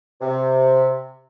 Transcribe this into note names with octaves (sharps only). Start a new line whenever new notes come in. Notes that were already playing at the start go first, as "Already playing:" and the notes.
C3